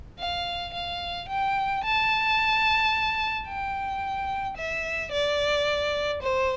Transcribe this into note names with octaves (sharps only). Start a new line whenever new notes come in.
F5
F5
G5
A5
G5
E5
D5
C5